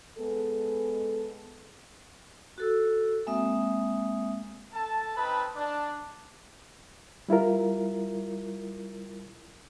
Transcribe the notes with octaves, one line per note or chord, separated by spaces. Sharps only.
G#3 B3 G#4 A4
F#4 A4 E6
G#3 A#3 C4 E5 D#6
A4 A5
C4 D#4 B4 A5 B5
D4
G3 E4 F4 A#4